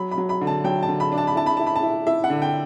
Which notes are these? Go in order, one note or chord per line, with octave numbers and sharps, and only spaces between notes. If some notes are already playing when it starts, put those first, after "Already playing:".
Already playing: F#3 B5
B5
F#3
B5
D3
A5
F#3 G5
A5
D3
B5
D4
A5
B5
E4 A5
B5
E4 A5
B5
A5
E4
E4 E5
F#5
D3
G5